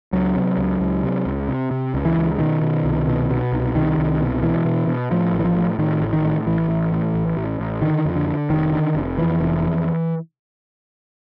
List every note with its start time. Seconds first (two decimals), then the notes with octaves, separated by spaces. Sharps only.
0.12 C#2 F#3
0.35 C3
0.58 C#2
0.80 C#2
1.03 C3
1.26 C#2
1.48 C3
1.71 C3
1.94 C#2
2.05 E3
2.17 C#2
2.38 B2 D#3
2.61 B2
2.84 C2
3.07 B2
3.30 B2
3.52 C2
3.75 C2 D#3
3.98 C2
4.19 B2
4.43 B2 E3
4.65 B2
4.87 B2
5.11 A2 F3
5.33 A1
5.39 E3
5.44 F3
5.56 A2
5.79 A2 D#3
6.01 A1
6.13 D#3
6.24 A2
6.46 A1 E3
6.68 A1
6.91 A2
7.14 A1
7.37 A1
7.60 A1
7.82 D3 D#3
8.05 F2
8.16 D3
8.27 D3
8.50 F1 D#3
8.73 D3
8.95 F1
9.18 F2 E3
9.40 F1
9.64 F2